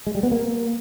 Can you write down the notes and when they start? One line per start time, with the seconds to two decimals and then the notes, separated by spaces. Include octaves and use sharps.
0.07 G#3
0.15 G3
0.23 B3
0.31 A#3